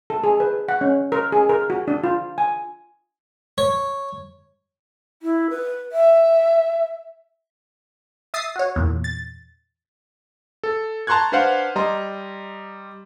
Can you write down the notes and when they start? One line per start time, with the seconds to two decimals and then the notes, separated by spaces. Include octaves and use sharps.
0.10 A4
0.24 G#4
0.40 B4
0.69 F#5
0.81 C#4
1.12 A#4
1.32 G#4
1.49 A#4
1.70 F#4
1.88 D4
2.04 F4
2.38 G#5
3.58 C#5
5.22 E4
5.50 B4
5.92 E5
8.34 E5 D#6 A6 C7
8.56 F#4 C#5
8.76 E2 A#2
9.04 A6
10.63 A4
11.07 A5 A#5 C6 C#6 F#6 G#6
11.32 D4 B4 C5 F5 F#5
11.76 G3 D#5 A#5 C6